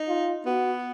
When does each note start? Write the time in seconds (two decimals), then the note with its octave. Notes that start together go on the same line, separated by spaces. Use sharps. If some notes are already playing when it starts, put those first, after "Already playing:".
Already playing: D#4
0.08 F4
0.46 B3 F#4